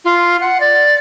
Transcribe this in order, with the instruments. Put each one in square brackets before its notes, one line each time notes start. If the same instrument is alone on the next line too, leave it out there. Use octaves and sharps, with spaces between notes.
[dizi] F4
F#5
D5